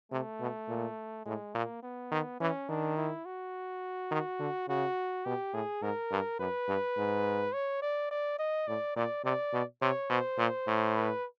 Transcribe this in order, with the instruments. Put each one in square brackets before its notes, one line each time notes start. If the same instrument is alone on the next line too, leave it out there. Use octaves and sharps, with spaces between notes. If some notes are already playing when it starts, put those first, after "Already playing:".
[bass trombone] C3 [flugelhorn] A3
[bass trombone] B2
A#2
[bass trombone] A2 [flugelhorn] G#3
[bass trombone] A#2 [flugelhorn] A#3
[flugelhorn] B3
[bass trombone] D#3
[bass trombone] E3 [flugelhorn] C#4
[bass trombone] D#3 [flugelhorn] D4
[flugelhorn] E4
F#4
[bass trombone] D#3
D3
[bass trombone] C#3 [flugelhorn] F#4
[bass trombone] B2 [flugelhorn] G4
[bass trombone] A2 [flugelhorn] G#4
[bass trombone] G#2 [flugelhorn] A#4
[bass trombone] G2
[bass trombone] F#2 [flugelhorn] B4
[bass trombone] G2
G#2
[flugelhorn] C#5
D5
D5
D#5
[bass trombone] A2 [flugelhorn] D5
[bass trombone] A#2 [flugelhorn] D5
[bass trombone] C3 [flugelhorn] D5
[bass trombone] B2
[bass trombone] C3 [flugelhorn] C#5
[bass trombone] B2 [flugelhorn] C5
[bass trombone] A#2
A2
[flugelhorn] B4